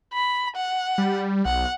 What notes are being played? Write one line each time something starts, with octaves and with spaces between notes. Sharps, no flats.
B5
F#5
G3
B1 F#5